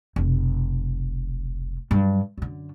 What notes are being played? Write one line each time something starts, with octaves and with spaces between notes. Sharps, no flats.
F1 B1
G2 F#3
F#2 D3